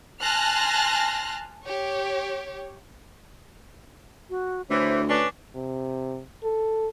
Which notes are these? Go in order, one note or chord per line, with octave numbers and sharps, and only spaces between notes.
G#5 A5 C6 F6 F#6 A#6
G4 C#5
F#4
D2 A2 E3 C5
C#4 D4 B4
C3
A4